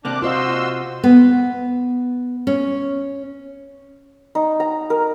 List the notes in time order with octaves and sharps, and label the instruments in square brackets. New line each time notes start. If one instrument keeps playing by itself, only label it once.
[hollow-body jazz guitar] C3 A#3 [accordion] D4 D6 F#6
[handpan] F4 C5 D#5 [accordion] F#4 C6 E6
[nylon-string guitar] B3
C#4
[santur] D#4
A#5
A#4